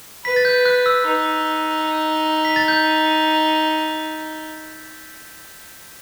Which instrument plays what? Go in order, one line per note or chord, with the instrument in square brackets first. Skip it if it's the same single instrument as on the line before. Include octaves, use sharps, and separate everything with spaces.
[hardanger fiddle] B4 [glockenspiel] B6
[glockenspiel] A6
G6
F#6
E6
[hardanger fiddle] D#4
[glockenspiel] B6
A6
G6